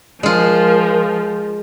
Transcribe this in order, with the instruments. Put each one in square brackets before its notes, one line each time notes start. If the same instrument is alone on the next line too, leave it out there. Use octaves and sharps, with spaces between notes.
[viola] F3 [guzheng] G#3 F4 [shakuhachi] A#4